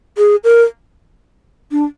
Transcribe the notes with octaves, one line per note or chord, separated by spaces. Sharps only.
G#4
A#4
D4